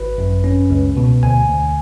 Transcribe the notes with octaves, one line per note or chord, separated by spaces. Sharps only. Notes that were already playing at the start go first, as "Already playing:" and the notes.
Already playing: G#1 B4
F#2
C#4
C#2
B2
D2 G#5
D2